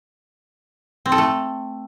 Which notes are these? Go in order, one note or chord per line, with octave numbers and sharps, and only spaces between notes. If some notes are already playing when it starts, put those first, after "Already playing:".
C4
A4
A3